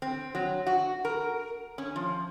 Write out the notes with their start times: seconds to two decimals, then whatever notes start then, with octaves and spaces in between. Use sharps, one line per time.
0.02 C4
0.35 F#3
0.67 F#4
1.05 A#4
1.78 C#4
1.96 F3